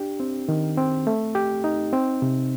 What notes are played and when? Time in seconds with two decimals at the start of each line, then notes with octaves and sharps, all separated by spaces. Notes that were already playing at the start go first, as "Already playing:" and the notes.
Already playing: D4 G4
0.20 C4
0.49 D#3
0.77 C4
1.07 A3
1.35 G4
1.64 D#4
1.93 C4
2.22 C3